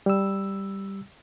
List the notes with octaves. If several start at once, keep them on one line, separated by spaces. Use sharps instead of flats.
G3 E6